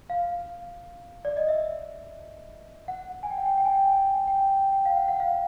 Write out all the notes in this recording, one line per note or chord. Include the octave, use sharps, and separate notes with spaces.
F5
D5
D#5
E5
F#5
G#5
G5
F#5
G5
G5
G#5
G5
G#5
G5
G5
G5
F5
F#5
F#5
F5